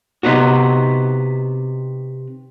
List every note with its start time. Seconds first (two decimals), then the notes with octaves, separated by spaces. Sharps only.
0.23 C3 B3 D#4 F#4